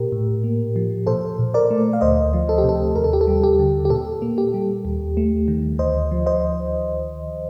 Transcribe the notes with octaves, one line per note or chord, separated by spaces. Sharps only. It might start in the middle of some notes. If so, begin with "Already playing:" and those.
Already playing: A#2 G4 A#4
A2
A#3
F3
A#2 A4 C5
A#2
A#4 D5
A3
F5
D2 C5 D#5
F3
A4
G4
C3
A4
D#2 A#4
A4
G4
A4
G3
G4
D3
G4
A#2 A4
A#3
G4
G3
D#2
A3
D#3
D2 C5 D#5
F3
C5 D#5